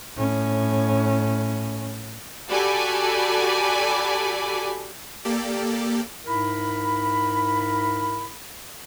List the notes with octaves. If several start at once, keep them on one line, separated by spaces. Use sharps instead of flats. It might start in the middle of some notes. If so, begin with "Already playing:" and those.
A2 C#4
F#4 G4 A4 D5 G#5 B5
A#3 G4 A4 D5
G#2 E4 A#4 B5